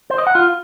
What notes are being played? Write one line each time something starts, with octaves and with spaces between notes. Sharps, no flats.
C5
D#5
F#5
F4